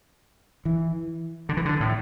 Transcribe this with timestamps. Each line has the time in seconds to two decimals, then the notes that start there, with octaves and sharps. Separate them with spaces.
0.65 E3
1.49 D3
1.57 E3
1.65 D3
1.80 A2